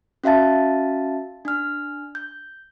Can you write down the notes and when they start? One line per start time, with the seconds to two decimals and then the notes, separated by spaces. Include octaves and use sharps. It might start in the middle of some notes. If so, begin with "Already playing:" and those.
0.24 C#4 F#4 E5 F5 A5 A6
1.45 D4 F6
2.15 G6